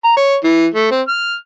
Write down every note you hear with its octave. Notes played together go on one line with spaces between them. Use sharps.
A#5
C#5
E3
A3
C4
F6